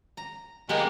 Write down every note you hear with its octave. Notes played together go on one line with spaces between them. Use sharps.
A#5
G#3 A#3 B3 G4 A#4